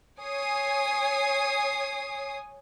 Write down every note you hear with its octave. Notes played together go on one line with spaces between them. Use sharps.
C#5 G#5 D#6 C7